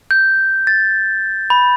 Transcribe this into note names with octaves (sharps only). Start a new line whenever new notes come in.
G6
A6
B5